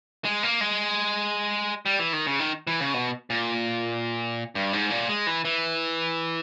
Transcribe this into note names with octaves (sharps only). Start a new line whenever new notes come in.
G#3
A#3
G#3
G3
E3
D#3
C#3
D#3
E3
C#3
B2
A#2
G2
G#2
A#2
G#3
E3
E3